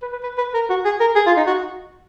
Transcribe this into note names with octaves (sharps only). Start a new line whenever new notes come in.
B4
B4
B4
B4
A#4
F#4
G#4
A#4
G#4
F4
D#4
F#4